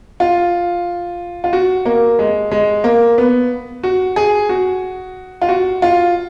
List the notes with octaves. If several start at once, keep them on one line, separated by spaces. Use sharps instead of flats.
F4
F4
F#4
A#3
G#3
G#3
A#3
B3
F#4
G#4
F#4
F4
F#4
F4